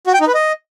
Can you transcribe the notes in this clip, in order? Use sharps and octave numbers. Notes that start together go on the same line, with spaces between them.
F#4
G5
D#4
B4
D#5